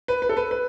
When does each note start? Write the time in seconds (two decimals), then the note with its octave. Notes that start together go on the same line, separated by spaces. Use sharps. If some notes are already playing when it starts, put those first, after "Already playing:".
0.08 B4
0.22 B4
0.29 A4
0.37 B4
0.51 B4